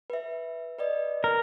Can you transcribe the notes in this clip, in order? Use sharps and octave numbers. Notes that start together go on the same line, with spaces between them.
B4 E5
B4 D5 D#5
A#4